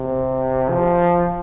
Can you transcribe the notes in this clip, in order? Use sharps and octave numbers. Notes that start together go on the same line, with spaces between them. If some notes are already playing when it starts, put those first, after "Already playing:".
Already playing: C3
F3